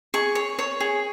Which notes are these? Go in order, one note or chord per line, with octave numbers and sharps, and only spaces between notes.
G#4 C#6
C#5
C#5
G#4